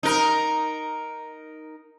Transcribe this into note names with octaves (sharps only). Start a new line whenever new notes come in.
D#4 A#4